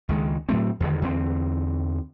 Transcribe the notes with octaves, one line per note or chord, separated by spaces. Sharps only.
C#2 D#3 G#3
A2 F#3 A3 C4
E2 G2 D3 D#3
E2 D3 C4